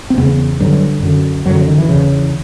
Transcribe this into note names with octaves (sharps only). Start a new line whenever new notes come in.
C4
E2 C#3 B3
G2 D3 F#3
F#2 D3
F#2 D3 F#3
F3
D#3
E3
E2 C#3